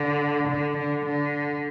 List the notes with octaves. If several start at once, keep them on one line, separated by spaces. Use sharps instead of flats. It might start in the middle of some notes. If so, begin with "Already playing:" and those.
Already playing: D3
D3
D3
D3